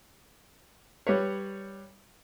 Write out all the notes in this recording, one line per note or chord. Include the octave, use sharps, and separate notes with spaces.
G3 B4 C#5